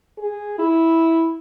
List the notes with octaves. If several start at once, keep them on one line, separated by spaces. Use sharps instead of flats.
G#4
E4